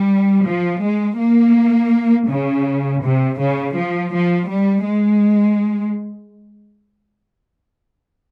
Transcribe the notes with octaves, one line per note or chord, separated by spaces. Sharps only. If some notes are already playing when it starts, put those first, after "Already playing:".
Already playing: G3
F3
G#3
A#3
C#3
C3
C#3
F3
F3
G3
G#3